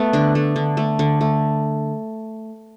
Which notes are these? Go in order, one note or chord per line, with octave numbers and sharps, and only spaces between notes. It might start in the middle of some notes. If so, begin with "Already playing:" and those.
Already playing: A3 B3
D3 D4
A3
D3
A3
D3
A3